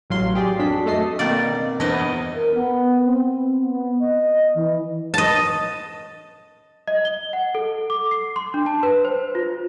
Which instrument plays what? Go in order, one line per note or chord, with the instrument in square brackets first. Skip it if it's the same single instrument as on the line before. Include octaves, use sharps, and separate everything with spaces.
[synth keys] A1 F#3 F5 C6
G4 G#4 D5
F2 F#3 D4 B6
A3 A4 D#5 C7
[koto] B2 D#3 D5 [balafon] A#3 C4
[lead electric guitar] E2 [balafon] D4 B4 C5 [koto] E4 D#5
[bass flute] A#4
B3
C4
B3
D#5
E3
[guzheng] D#5 A5
[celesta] D#5
G7
F#5
A4
D6
C7
C6
D4
A5
B4
C5
F4